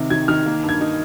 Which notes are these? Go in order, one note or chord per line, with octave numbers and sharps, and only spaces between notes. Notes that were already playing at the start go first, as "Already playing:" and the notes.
Already playing: C3 D#3
D#3 G#6
D#3 F6
A#3
G2
G#6
D#4